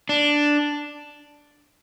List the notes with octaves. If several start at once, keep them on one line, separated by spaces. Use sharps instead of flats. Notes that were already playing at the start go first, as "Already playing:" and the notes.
D4